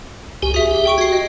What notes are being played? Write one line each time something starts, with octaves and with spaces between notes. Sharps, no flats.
C#2 G4 G#5
F#4 G#4 E5
G4
G5 C#6 D7
F#4 G#6 C7
D#5